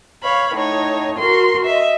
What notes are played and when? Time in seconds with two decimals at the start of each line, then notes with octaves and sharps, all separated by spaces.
0.23 C#5 F5 B5
0.55 A2 D#4 C#5
1.19 F#4 A#4 C6
1.65 D#5 E5